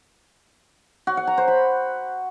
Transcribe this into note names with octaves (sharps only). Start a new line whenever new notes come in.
F#4
F#5
A#5
C5
B5